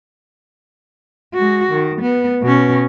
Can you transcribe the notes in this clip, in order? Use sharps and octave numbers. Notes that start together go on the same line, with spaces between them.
G#3 F#4
D#3
B3
B2 C#4